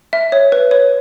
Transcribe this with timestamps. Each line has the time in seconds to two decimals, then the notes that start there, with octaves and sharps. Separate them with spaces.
0.13 E5
0.32 C#5
0.52 B4
0.71 C#5